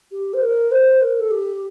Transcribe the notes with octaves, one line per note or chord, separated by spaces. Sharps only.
G4
C5
A#4
C5
A#4
A4
G4